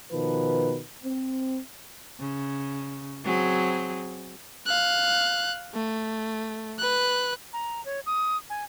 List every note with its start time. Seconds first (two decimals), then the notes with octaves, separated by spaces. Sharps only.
0.11 B2 D#3 F3 B4
1.03 C4
2.19 C#3
3.24 F#3 C4 G#4
4.66 F5 F#6
5.74 A3
6.79 B4 F#6
7.53 A#5
7.85 C#5
8.06 D#6
8.50 G#5